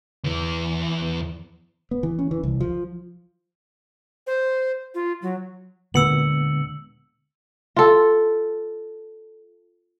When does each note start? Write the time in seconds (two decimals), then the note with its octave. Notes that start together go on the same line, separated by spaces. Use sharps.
0.24 E2 E3
1.91 B3
2.03 E3
2.19 C#4
2.31 E3
2.43 C2
2.60 F3
4.27 C5
4.95 F4
5.22 F#3
5.94 D2 A#2 D3 G#3 B3 E6 C#7 F#7
7.76 F4 A4